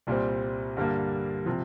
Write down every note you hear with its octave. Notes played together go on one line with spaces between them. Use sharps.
C2 A#2 G3 C4
G2 D3 G3 A#3
C3 F3